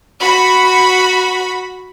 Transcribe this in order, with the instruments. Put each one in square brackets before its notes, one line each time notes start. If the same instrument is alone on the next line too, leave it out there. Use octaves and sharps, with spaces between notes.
[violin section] F#4 B5